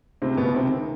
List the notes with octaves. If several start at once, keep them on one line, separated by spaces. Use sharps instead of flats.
C#2 C3 C4
B2 B3
C#2
C3 C4
D#3